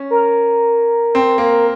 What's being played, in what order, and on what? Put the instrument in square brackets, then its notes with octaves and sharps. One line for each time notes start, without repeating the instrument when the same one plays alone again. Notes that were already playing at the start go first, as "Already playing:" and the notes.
Already playing: [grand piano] C#4
[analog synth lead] A#4
[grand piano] C4
A#3